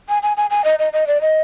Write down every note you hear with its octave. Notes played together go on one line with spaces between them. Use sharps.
G#5
G#5
G#5
G#5
D#5
D#5
D#5
D5
D#5